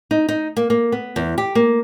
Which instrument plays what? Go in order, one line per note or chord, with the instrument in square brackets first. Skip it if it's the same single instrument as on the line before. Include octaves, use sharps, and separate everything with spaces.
[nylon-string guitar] D#4
D#4
A#3
A#3
B3
E2
G4
A#3